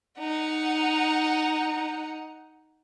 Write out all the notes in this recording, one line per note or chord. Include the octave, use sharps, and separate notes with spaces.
D#4 F#5